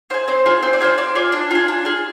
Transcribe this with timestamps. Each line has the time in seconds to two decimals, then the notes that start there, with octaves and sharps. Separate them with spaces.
0.10 F4 G#4 C5
0.28 C4 C5
0.46 F4 G#4
0.62 C4 C5
0.73 D5
0.80 F4 G#4 C5
0.98 C4 D5
1.15 F4 G#4 D5
1.32 D4
1.51 F4 G#4
1.68 D4
1.85 F4 G#4